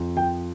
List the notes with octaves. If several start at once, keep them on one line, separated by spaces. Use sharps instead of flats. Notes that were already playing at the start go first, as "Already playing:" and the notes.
Already playing: F2
F3 G5